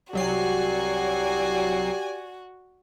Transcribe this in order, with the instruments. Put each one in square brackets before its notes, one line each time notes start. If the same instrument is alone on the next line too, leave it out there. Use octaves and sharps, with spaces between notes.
[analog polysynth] C2 F#3 C7 [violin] F#4 [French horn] G4 [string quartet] D5 G#5